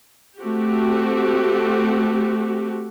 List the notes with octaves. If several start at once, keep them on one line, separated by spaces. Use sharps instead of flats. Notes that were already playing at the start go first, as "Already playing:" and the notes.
A3 C4 F#4 G4